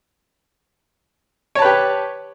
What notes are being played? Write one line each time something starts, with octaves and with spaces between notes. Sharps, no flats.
G4 B4 C#5 A5